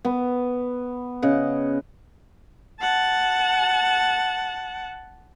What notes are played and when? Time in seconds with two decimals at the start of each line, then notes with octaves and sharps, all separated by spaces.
0.05 B3
1.22 C#3 D#5 F#5
2.81 F#5 A5